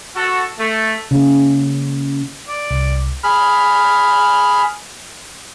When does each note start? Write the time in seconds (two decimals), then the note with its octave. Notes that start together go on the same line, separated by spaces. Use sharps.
0.16 F#4 A4
0.59 A3
1.11 C#3 A#3
2.48 D5
2.71 C2
3.24 G#4 B5 F6